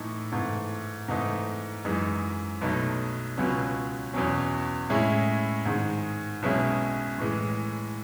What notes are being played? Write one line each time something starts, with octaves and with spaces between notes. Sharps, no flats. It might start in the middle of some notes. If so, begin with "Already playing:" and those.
Already playing: A2 E3 A3 D#4
G#2 E3 A3
G#2 E3 A3 D#4
F#2 E3 G#3 D#4
B1 B2 A3 D#4
C#2 B2 F#3 C#4
E2 B2 F#3 C#4
A2 G#3 C#4 E4
G#2 D#3 G#3
B1 B2 G#3 C#4 E4
A2 E3 G#3